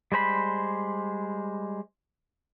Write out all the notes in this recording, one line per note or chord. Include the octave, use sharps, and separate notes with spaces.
G3 G#3 C5 B5